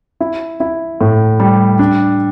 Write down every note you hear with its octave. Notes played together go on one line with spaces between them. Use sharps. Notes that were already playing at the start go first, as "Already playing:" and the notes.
E4
E4
A2
G3
D4